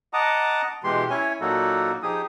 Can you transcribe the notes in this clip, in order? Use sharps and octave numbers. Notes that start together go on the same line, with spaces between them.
D#5 F#5 A5 A#5 D6 D#6
B2 E3 G#3 G4 C6
C#4 E4 C#5 G#5
A#2 F#3 A#3 D#4 F#4 A4
F3 D#4 G4 G#4 D#6